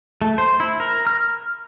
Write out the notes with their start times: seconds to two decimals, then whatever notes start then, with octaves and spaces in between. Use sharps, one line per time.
0.22 A3
0.38 C5
0.60 E4
0.80 A#4
1.07 F6